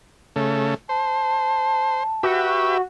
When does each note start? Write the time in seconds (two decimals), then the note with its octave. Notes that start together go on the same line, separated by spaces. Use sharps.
0.36 C#3 A3
0.89 C5 A5
2.23 F#4 G4 B4 E5